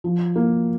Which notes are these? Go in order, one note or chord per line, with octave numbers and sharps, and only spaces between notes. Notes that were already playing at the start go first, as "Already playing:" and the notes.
F3
A#3